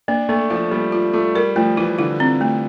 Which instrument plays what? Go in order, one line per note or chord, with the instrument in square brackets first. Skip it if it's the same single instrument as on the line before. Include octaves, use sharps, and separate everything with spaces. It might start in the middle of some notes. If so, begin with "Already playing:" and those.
[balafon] A#3 [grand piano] D4
[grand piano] A3 [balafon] A#3
[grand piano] F3 [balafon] F4
[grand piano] G3 [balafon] A#3
[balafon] F4
[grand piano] A3 [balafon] F4
[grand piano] G3 [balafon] A#4
[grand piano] F3 [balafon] A3
[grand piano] E3 [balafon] E4
[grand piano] D3 [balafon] E4
[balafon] C4
A3